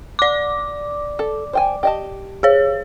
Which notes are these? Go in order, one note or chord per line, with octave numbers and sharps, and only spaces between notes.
D5 D6
A4
C5 G5 G#5
G4 D#5 A5
G#4 C#5